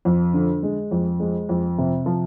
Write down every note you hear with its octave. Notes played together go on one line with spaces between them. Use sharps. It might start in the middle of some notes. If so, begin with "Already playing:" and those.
F2
D3
G#3
F2
G#3
F2
C3
F3